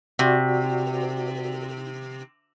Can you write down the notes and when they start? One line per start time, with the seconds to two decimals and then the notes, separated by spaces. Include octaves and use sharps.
0.19 C3 F#4 D5